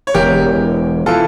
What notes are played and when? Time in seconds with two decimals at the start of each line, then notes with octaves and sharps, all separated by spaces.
0.07 C#5
0.14 E1 E2 E3 G4 A#4
1.06 E3 F4 A4